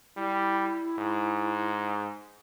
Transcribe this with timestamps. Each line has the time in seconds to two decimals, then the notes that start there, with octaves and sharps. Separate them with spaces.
0.17 G3 E4
0.98 G#2